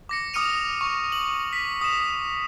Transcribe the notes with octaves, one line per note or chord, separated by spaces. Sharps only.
D6 A#6 C#7
D6 D#6 F6 C#7 D#7 F7
C#6
F#7
B6
D#6 E7